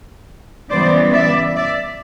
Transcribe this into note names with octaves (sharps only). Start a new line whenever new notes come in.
C#3 E3 G3 B3 C5 D5
D5 E5
D5 E5